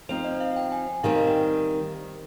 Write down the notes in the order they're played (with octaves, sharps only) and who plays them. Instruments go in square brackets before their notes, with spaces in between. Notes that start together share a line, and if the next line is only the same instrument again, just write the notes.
[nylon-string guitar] F3 C4 D#4 [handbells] C5
[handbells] D#5
F5
G5
G#5
[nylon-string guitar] D#3 G3 C4 [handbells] F5
[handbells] D#5
G5